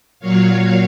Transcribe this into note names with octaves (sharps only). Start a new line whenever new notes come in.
A#2 F#3 C#5 F5